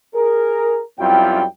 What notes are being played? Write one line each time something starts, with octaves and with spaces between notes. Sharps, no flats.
G#4 A#4
F#2 G3 C4 E4 F4 G5